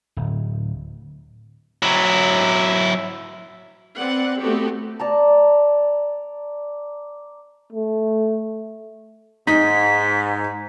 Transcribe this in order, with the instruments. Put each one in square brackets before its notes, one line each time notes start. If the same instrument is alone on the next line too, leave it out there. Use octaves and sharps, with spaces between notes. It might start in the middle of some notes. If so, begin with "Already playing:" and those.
[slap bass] D1
[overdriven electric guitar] F#3 E4
[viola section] C4 B4 D5 F#5
A3 B3 C4 F#4 G4 A4
[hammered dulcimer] D5 A5 A#5
[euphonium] A3
[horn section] G#2 [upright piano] D#4 [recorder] B6